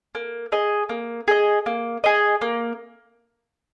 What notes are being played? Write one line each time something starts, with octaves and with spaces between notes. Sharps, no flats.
A#3
G#4 D#5
A#3
G#4 D#5
A#3
G#4 D#5
A#3